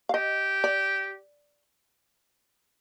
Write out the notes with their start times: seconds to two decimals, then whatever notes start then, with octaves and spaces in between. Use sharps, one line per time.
0.09 F5
0.14 G4 D#5
0.64 D5